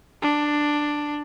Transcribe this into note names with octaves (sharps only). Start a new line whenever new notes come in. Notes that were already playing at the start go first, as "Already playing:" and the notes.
D4